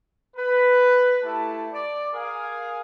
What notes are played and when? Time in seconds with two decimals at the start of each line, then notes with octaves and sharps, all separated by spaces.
0.36 B4
1.23 A3 E4 G4 A5
1.73 D5
2.13 G#4 A#4 F5 G#5